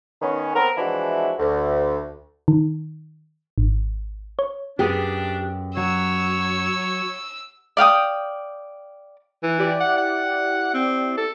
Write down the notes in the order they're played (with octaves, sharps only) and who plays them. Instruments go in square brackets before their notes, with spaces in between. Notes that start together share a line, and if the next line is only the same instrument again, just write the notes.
[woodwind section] D#3 B3 C#4
B3 C4 A4 A#4
E3 F3 G#3 D4 E4 F#4
D2
[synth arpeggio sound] D#3
G#1
C#5
[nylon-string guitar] F#2 B3 G#4 [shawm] D4 [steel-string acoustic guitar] G4
[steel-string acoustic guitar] F#3 [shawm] C#5 [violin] E6
[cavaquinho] D5 F5 G5 D#6
[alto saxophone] E3
[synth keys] E4 G4 D5
[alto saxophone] F#5
F#5
C4
A4